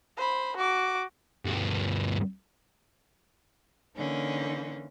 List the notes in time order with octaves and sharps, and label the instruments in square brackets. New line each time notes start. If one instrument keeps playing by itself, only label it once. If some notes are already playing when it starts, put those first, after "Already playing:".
[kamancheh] C5 B5
F#4 D6
[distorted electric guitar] D2 G2
[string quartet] D3 E3 A#3 C#4 D#4